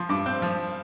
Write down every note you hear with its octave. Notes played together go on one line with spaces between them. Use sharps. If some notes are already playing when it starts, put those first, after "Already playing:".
Already playing: F3 C6
G2 D6
C4 G6
F3